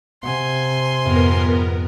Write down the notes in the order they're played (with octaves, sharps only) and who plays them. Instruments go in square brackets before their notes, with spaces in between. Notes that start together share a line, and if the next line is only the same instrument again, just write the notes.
[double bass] C3 [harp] F#5 [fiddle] G#5 C6
[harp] F2 G#2 [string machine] B3 A#4